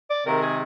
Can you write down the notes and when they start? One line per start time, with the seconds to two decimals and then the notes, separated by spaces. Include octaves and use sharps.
0.10 D5
0.26 C3 D#3 G#3 A#4
0.42 G#4